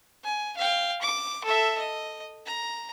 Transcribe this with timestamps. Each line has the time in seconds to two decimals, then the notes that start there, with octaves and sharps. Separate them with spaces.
0.24 G#5
0.57 F5 G5
1.02 D6
1.44 A4 E5
1.78 D#5
2.46 A#5